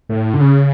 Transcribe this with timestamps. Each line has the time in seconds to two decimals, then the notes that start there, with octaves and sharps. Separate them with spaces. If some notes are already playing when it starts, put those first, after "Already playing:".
0.09 A2
0.34 D3
0.40 C#3